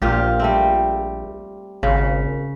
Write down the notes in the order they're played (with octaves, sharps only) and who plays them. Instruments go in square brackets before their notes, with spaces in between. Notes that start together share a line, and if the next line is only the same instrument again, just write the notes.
[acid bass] A#1 [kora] A#2 F4 G4
[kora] G3 A3 C4
[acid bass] G#1 [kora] C#3